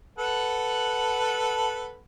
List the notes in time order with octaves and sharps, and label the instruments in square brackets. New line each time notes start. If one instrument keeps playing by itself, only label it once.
[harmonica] A4 B4 F#5